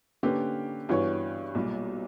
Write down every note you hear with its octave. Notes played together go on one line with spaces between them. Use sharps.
D3 A#3 C#4 G4 B4
G2 E3 B3 F#4 C#5
B1 A#2 G3